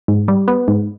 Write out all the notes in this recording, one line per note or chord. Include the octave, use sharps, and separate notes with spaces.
G#2
G3
B3
G#2